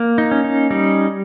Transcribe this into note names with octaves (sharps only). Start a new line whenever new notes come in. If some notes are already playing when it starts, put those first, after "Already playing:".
Already playing: A#3
D#4
C#4
D#4
G3 D#4